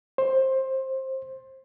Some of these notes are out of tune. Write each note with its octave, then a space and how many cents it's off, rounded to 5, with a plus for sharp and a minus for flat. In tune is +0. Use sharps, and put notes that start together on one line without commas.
C5 +20